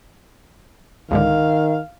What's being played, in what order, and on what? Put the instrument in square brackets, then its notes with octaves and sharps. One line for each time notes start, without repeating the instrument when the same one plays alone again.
[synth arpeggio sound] C#2 G#2 D3 [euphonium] D#3 [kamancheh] F5